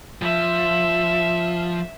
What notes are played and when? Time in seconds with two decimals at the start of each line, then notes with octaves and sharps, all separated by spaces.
0.22 F3 E5